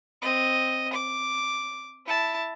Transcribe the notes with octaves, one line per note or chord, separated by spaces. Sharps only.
C4 D#5
D6
E4 A5